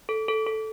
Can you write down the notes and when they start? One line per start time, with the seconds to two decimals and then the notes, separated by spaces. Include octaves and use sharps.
0.09 A4
0.28 A4
0.47 A4